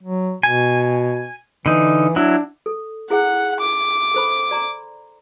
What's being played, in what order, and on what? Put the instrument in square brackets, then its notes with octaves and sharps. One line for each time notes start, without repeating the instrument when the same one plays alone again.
[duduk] F#3
[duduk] B2 [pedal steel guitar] G#5
[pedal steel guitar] D3 D#4 [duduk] E3
[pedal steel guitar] F#3 E4 [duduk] D4
[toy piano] A4
[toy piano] E4 G#4 [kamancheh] F#5
[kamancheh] D6
[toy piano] A4 C5 B5
D5 A#5 C6